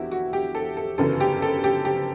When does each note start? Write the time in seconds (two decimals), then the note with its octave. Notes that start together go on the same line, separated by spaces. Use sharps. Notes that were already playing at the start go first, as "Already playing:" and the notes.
Already playing: E1 E2 D3 E4 F#4 G4
0.12 F#4
0.33 G4
0.55 A4
0.77 A4
0.98 G1 F#2 C#3 E3 A4
1.20 G4
1.42 A4
1.64 G4
1.85 G4